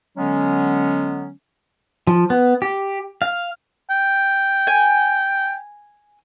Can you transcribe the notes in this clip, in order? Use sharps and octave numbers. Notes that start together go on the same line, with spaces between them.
D3 F#3 G#3 B3 C#4
F3
B3
G4
F5
G5
G#5